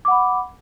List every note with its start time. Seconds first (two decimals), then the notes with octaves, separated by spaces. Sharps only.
0.05 D6
0.08 F#5
0.11 B5